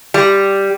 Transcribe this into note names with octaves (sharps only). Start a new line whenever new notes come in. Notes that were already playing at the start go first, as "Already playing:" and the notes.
G3